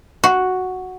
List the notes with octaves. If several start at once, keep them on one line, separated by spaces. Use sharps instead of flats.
F#4